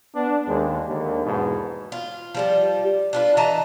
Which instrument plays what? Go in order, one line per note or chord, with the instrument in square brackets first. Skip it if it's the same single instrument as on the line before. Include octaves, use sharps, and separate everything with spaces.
[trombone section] B3 D4
D#2 G#3
D#2 D3
E2 G#2 B2
[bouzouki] F4
F3 G3 G4
D4 F4 B4
E3 D#5 A5 A#5